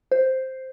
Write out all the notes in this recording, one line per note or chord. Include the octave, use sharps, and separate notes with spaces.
C5